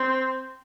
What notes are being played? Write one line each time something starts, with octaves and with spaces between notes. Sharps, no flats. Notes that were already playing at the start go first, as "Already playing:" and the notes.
Already playing: C4